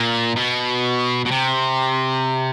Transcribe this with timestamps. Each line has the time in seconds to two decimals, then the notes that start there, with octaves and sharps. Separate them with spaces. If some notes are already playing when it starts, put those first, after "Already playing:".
Already playing: A#2
0.36 B2
1.25 B2
1.31 C3